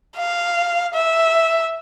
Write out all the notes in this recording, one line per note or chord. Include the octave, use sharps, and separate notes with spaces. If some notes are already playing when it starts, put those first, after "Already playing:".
F5
E5